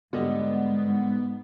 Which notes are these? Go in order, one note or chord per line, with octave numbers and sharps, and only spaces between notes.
G#2 D3 G3 B3 D#5